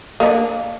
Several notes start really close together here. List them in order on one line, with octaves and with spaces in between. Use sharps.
A#3 D#4 D4